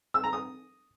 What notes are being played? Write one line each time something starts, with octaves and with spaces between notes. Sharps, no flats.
E6
A#5
D#6